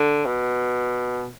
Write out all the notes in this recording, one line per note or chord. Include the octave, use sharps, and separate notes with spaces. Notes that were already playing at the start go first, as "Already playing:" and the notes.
Already playing: D3
B2